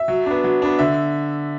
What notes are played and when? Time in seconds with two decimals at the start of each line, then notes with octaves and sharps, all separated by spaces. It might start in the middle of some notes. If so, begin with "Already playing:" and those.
Already playing: E5
0.08 F#3
0.26 B3 D4
0.44 F#3
0.62 B3 D4
0.79 D3 E5